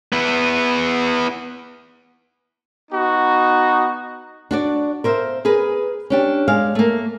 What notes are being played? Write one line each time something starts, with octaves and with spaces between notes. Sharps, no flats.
B3 E4
B3 D#4 F#4
D4 F#4 D5
A#4 C5 E5 F5
G#4 A#4 B4
C#4 D4 G4
G#3 D5 F5
A3 A#3